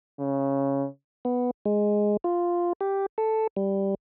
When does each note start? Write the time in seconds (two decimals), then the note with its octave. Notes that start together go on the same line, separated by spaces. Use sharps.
0.19 C#3
1.25 B3
1.66 G#3
2.24 F4
2.81 G4
3.18 A4
3.56 G3